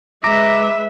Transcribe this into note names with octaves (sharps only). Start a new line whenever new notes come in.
G#3 B4 E5 A#5 D6